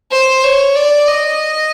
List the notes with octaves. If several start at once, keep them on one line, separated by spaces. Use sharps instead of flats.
C5
C#5
D5
D#5